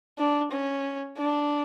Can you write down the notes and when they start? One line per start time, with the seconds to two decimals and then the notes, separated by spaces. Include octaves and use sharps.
0.18 D4
0.52 C#4
1.18 D4